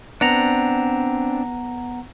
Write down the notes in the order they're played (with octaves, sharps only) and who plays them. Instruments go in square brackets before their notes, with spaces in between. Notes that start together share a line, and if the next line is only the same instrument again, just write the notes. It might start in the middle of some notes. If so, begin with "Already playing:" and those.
[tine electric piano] B3 F#5 A#5 [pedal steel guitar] C4 D4